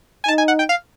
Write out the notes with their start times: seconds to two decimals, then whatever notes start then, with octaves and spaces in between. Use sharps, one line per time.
0.24 G#5
0.28 D#4 A5
0.38 G#5
0.48 F#5
0.59 G5
0.69 F5